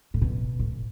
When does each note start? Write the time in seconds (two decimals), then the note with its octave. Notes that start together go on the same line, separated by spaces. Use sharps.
0.14 A2
0.21 B2
0.59 A2